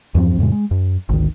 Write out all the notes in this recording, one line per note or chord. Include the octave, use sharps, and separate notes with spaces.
E2 G2 F3 C4
F2 A2 C#3 G#3
G#3
F#2
G#1 D2 D#3